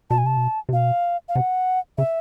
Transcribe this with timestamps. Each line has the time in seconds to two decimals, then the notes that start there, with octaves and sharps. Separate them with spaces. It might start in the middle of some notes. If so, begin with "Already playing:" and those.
0.10 B2 A5
0.18 G#5
0.23 C3 A5
0.37 B2
0.69 C3
0.73 B2 F5
1.29 F5
1.35 C3 F#5
1.98 C#3 E5